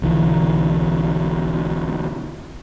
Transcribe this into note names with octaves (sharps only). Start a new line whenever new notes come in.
B1 D3 E3